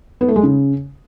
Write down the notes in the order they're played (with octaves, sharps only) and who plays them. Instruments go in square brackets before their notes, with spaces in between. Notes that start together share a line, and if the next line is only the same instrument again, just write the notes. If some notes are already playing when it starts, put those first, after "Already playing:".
[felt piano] B3
A3
G#3
C#3